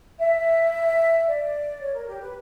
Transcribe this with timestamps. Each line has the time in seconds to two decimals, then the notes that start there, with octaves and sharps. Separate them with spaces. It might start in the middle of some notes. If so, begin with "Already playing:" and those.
0.20 E5
1.27 D5
1.81 C#5
1.94 A#4
2.08 G4
2.21 B4